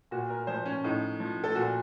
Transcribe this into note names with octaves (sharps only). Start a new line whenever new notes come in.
A#2 F#4
A#4
F3 C5
C#4
A2 D#4
F3
A4
A#2 F#4